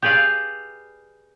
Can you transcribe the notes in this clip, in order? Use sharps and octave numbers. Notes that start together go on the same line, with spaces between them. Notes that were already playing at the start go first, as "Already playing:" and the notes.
G4 G#4 B4 D5 F5